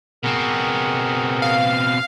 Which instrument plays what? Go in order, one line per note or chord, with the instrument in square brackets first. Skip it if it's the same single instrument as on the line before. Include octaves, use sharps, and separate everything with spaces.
[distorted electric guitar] B2 C4 [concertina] G#4 A#4 F#5
[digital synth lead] F5